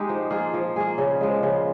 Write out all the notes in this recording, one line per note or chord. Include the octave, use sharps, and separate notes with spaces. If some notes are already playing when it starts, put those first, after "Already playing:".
Already playing: G#3 D#4 G4
F3
A#3 F4 G#4
F3
A#3 F4 G#4
C#3
F3 G#3
C#3